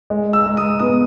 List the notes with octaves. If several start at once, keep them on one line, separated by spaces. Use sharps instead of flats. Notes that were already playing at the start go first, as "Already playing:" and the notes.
G#3
E6
G#3
D#6
B3 D#6